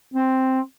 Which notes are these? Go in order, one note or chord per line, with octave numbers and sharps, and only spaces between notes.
C4